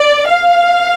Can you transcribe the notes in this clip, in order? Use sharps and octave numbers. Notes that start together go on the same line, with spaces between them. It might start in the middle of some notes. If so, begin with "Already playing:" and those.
Already playing: D5
F5